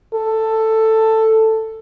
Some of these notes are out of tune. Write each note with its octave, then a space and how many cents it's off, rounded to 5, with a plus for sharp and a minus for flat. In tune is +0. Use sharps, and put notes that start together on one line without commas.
A4 +10